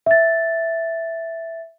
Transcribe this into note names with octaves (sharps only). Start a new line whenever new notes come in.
E5 A6